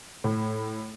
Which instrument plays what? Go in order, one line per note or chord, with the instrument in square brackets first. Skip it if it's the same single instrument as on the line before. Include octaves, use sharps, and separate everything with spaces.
[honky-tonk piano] A2